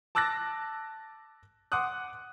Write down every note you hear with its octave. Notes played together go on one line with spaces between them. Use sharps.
A5 D6 E6 F#6 A6 A#6
F#5 C6 D6 D#6 F#6